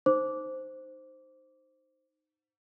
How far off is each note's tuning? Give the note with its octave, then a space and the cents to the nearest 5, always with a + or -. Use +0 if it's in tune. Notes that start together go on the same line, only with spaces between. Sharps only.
D#4 -10 C5 +0 D6 -15